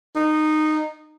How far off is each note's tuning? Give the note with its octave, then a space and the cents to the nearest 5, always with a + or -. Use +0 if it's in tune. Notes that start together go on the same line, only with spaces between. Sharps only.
D#4 -15